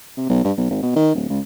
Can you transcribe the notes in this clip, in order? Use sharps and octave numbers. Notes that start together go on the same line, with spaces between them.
C3
B1
G2
B1
G#1
B2
D#3
D1
C#2